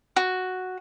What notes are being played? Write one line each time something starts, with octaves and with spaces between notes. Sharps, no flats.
F#4